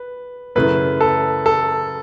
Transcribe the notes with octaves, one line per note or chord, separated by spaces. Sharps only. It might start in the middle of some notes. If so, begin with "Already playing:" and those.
Already playing: B4
F#2 C#3 E3 A3 B4
A4
A4